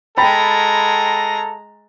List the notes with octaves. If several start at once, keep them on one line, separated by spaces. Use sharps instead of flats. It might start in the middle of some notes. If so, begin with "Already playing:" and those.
G#3 A4 G5 A#5 B5 A6